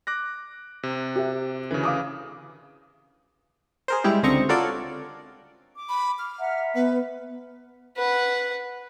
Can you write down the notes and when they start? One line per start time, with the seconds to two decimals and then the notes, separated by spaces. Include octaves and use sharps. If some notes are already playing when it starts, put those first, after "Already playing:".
0.07 D6 F#6 A#6
0.83 C3
1.16 G4 E5
1.71 D2 C#3 E3
1.84 F5 D6 D#6
3.88 G#4 A#4 C5
4.04 G3 G#3 E4 G4
4.23 C#2 D3 C4 D#5 A#5 C#6
4.49 F4 F#4 A4 A#4 C#5 D5
5.76 D6
5.89 B5
6.19 F6
6.40 E5 F#5 A#5
6.75 B3 B4
7.97 B4 F#5